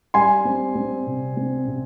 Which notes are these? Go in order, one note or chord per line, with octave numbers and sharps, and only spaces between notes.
G3 G#5 C6
C4
C4
C3
C4
C3